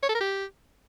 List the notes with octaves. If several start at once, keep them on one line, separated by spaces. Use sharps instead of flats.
C#5
A4
A#4
G4